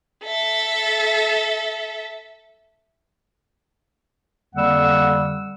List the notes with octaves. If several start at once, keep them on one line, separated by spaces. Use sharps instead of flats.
A4 E5
F2 D3 G3 A#3 F#5 E6